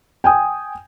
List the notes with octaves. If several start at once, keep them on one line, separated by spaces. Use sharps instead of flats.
G5 G#5 D#6